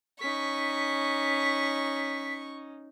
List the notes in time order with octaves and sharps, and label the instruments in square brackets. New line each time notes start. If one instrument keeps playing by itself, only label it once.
[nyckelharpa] C#4 D#4 [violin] C#6 [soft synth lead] B6